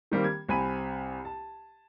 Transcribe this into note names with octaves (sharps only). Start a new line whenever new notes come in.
D#3 G3 A#3 C4
G#6
C2 C4 G#5 B5 D#7
A5